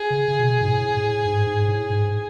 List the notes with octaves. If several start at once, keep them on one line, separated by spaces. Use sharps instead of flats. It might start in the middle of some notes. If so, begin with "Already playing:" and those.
Already playing: G#4
C#3
C#3
B2
G#2
A2
A2
G#2
G#2
A2
G#2